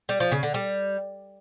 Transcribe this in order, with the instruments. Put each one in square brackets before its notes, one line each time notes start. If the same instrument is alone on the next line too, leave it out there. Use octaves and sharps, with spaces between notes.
[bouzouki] G3
F3
C#3
D3
G3